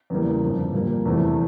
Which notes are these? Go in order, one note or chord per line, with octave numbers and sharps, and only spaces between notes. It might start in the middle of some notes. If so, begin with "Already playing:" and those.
E2 C#3 E3 G3 A#3
G1 F2 D3 F3
A#2 G3 A#3
F1 E2 C3 E3 A3